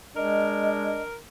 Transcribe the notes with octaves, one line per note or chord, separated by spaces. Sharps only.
G#3 D4 A#4 D#5